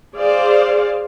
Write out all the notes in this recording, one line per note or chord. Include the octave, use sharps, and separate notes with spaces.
G#4 C5 D5 F5